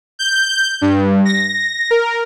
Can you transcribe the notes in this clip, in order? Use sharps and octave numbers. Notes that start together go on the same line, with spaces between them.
G6
G2
A#6
A#4